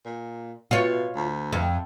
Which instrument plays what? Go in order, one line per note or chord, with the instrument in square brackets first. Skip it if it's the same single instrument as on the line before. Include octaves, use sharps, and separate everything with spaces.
[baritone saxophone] A#2
[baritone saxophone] B2 [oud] F4 C#5
[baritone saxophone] D2
[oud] F2